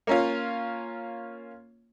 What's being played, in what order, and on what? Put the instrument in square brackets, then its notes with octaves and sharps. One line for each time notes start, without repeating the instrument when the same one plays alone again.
[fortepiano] A#3 C#4 F4